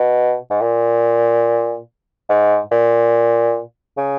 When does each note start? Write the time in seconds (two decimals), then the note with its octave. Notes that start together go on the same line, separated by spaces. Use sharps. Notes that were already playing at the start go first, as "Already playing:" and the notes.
Already playing: B2
0.51 G#2
0.61 A#2
2.29 G#2
2.72 A#2
3.97 C#3